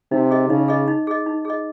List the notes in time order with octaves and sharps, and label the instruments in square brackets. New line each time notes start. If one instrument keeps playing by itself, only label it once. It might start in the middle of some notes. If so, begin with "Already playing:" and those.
[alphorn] C3 [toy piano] D#4
[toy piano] G#4 D#5
[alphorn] C#3 [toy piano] D#4
[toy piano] G#4 D#5
D#4
G#4 D#5
D#4
G#4 D#5